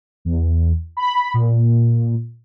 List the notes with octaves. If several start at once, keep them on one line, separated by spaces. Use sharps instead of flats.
E2
B5
A#2